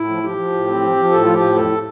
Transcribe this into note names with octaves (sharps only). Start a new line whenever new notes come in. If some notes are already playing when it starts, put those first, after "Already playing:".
Already playing: A2 E4
F3
F3 G4
F3
A2
C4
F3
F3
A2 A4
F3 F4
G4
A2
F2 A4